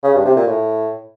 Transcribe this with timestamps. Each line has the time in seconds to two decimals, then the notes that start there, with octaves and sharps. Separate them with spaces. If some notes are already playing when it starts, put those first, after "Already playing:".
0.03 C#3
0.14 G2
0.25 C3
0.36 A#2
0.47 A2